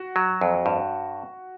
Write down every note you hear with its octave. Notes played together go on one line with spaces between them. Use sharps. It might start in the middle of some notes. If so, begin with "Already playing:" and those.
Already playing: F#4
F#3
F2
G2